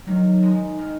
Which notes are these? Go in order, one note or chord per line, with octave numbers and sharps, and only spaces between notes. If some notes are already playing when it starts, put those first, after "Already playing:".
D#3 F#3
G#3 D#4
D#3